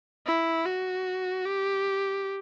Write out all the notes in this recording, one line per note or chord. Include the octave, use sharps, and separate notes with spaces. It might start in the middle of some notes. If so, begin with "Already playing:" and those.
E4
F#4
G4